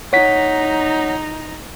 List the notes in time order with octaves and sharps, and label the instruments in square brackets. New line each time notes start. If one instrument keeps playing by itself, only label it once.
[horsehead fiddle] D#4 A#5 [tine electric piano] C#5 F#5 B6